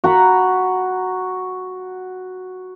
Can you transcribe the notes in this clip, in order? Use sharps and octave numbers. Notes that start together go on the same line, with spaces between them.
F#4 A#5 B5